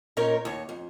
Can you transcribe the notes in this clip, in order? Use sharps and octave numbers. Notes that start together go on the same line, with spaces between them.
A#2 C#4 D#4 A#4 C#5
D#2 C#5
F2